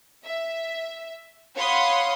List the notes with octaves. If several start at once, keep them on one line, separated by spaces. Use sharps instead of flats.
E5
C#5 F5 F#5 B5 C6 D#6